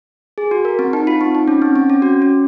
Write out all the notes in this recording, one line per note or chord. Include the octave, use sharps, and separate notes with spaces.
G#4
F#4
A#4
C4
D#4
F4
C4
D#4
C#4
C4
C4
C#4
F#4
C#4